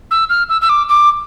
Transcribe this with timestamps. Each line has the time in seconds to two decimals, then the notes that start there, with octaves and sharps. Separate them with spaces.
0.11 E6
0.30 F6
0.49 E6
0.62 E6
0.69 D6
0.89 D6